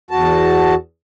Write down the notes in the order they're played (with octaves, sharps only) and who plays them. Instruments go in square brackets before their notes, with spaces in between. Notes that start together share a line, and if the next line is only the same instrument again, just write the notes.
[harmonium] E2 F#4 A5